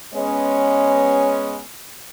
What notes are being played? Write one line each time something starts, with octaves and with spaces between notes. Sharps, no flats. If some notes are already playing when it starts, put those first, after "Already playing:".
G#3 B3 C#4